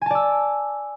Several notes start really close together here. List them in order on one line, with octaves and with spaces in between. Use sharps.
G#5 A5 D5 E6